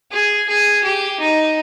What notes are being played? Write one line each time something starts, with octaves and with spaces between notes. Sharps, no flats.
G#4
G#4
G4
D#4